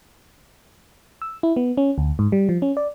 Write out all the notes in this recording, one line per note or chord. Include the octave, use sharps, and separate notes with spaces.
E6
E4
B3
C#4
D2
G#2
G3
F3
C#4
D5